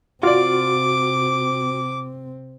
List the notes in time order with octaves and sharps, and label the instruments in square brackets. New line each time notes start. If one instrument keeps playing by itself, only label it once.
[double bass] C3 C4 [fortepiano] F4 D5 [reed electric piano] F#4 [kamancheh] D6